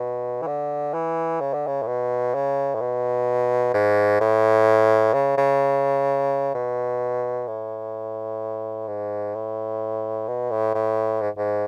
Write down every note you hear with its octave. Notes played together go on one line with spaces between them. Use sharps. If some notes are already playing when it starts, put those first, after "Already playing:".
Already playing: B2
E3
D3
E3
C#3
D3
C#3
A2
B2
C#3
A2
B2
G#2
A2
C#3
C#3
B2
A2
G#2
A2
B2
A2
A2
G#2
G#2